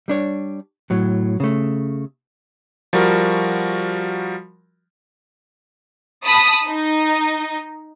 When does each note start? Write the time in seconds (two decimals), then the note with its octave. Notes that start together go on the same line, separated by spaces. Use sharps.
0.08 G3 D4 C#5
0.90 A2 F#3
1.40 C#3 A3
2.93 F3 G3 F#4 A#4
6.26 A5 B5 D#6
6.68 D#4